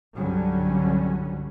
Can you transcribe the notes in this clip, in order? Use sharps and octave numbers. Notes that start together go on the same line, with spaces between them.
C2 G2 D3 F#3 G3 C#4